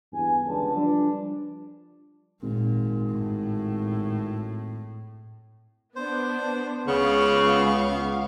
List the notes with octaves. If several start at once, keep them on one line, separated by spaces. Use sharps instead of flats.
E2 G2 G#5
G1 C#2 D3 B4 A5
F3 G3 D4
G#1 A#2
A2
B3 D4 C5
C#2 C#3 B3 F5 C#6